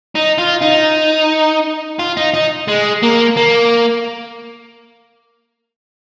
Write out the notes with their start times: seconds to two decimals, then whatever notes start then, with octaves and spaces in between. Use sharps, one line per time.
0.15 D#4
0.38 F4
0.61 D#4
1.99 F4
2.17 D#4
2.34 D#4
2.68 G#3
3.03 A#3
3.37 A#3